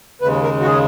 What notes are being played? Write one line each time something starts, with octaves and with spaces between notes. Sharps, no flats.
D#2 C#3 G#3 B4
A#4
F#4
G#4